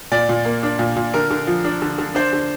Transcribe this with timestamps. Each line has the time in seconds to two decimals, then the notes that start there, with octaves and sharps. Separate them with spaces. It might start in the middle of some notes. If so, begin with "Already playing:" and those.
0.12 A#2 D5
0.29 A#2
0.45 A#3
0.63 D4
0.79 A#2
0.96 A#2
1.14 D3 A#4
1.31 D3
1.47 F3
1.64 D4
1.82 D3
1.98 D3
2.15 D4 C5
2.33 D3